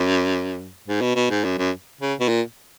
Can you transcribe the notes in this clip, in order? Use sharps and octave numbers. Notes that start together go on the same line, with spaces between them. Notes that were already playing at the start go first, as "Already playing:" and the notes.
Already playing: F#2
G#2
B2
B2
G#2
F#2
F#2
C#3
B2
A#2